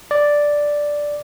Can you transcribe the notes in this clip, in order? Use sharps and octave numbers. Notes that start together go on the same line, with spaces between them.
D5